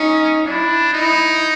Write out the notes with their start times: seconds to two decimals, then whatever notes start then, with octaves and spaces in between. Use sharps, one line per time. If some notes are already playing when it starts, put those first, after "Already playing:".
Already playing: C#4 D#4
0.46 D4 E4
0.93 D#4 E4